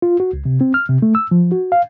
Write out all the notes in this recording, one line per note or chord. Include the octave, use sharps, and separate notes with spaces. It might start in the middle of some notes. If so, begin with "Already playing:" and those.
F4
F#4
C#2
C3
C4
F6
C3
A3
E6
F3
F#4
F5